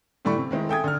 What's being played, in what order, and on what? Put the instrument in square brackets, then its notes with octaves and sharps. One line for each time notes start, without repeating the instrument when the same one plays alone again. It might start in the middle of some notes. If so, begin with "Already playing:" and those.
[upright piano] A2 D3 G3 A3 B5 C#6
C3
D#3 G#3 C4 E4
A4 E5 G5 G#5 D#6 G#6
D3 F6